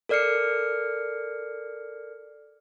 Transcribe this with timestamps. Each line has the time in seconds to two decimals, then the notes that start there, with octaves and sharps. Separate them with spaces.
0.09 A4 A#4 D5 F6 C7 C#7